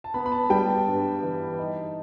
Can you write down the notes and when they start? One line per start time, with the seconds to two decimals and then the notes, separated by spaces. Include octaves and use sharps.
0.04 A5
0.14 B3 B5
0.26 B5
0.32 A5
0.50 G3 G5
0.69 A5
0.87 G2
1.23 E3
1.59 D#4